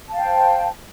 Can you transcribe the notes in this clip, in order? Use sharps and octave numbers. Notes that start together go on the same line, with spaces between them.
C5 F5 G5 A5